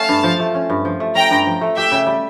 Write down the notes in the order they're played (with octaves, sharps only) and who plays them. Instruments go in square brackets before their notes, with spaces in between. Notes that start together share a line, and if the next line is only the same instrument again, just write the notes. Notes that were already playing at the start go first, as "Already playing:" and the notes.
Already playing: [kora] A3 C#4 [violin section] F5 A5
[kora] G2
F3
A3
C#4
G2
F3
A3
[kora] C#4 [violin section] G5 A#5
[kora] G2
F3
A3
[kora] G4 [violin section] E5 G5
[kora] C#3
G3